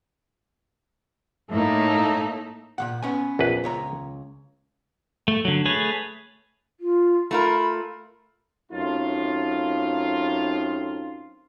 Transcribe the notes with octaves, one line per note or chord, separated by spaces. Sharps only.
A2 A3 A#3 D#4
A#2 C#3 F#5
B3 C#4 G#5
A#1 E2 B4
C#2 C#5 A#5
A3
D3 F#3
A3 G#4 B4 C#5
F4
A3 F4 A#4 B5
F#2 A2 C4 D#4 F4